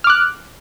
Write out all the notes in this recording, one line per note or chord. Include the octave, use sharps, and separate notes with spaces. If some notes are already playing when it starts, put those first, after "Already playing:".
D6 F6 F#6